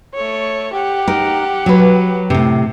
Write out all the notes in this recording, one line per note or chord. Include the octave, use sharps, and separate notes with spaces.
A3 C#5
G4 F#5
D#4 A#4
F#3 B4
A2 C3